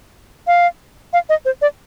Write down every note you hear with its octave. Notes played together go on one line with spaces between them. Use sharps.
F5
F5
D#5
C5
D5